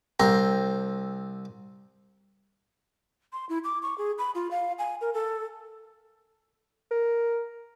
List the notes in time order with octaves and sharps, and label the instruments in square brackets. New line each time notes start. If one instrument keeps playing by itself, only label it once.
[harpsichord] C2 C4 A#5
[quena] C6
E4
D6
C#6
G#4
B5
F4
F5
G#5
A#4
A4
[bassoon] A#4